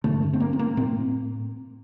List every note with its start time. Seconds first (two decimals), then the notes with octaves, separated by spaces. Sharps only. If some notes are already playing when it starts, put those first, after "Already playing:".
0.04 D3 A3
0.08 G2
0.23 A3
0.33 C4
0.40 A#3
0.53 C4
0.59 A#3
0.77 A2 C4